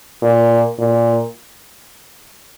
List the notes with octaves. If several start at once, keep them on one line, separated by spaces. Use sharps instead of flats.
A#2
A#2